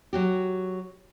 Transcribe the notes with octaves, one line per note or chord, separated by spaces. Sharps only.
F#3 F#4 G4